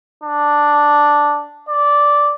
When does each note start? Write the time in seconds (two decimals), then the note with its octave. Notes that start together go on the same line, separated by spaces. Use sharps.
0.24 D4
1.69 D5